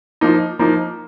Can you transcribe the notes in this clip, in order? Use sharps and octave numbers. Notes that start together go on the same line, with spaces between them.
F3 A#3 D#4
F3 A#3 D#4